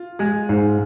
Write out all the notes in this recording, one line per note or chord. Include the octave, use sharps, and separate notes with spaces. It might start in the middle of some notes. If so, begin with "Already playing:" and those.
Already playing: F4
G#3 G#4
G#2